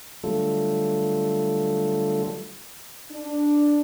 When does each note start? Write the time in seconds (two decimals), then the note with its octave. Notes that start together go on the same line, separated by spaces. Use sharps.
0.24 D3 F#3 G3 A3 F4 A4
3.11 D4